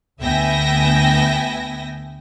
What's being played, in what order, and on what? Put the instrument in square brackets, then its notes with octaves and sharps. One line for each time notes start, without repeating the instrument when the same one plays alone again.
[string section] D2 B3 E5 G5 G#5 A#6